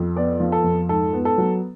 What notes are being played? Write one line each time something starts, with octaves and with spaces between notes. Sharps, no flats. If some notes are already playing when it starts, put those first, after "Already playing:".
Already playing: F2
B3 D5
F3
A4
F2
G#2 A4
B3
A4
F#3